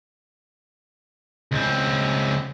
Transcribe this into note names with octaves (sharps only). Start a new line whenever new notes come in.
C#2 C4